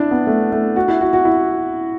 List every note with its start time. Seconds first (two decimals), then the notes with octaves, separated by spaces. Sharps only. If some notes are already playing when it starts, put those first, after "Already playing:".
Already playing: D4 E4
0.11 B3
0.27 A3
0.52 A3
0.76 F#4
0.88 E4
1.01 F#4
1.13 F#4
1.25 E4